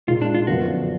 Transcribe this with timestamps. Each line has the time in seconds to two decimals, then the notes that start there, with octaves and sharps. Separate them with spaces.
0.08 A#2 G#3 D#4 F4
0.22 D4
0.35 F4
0.47 F#2 D3 F3 B3 F#4